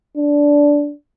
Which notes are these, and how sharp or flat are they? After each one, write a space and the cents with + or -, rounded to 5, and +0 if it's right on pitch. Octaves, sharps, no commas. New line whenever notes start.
D4 -10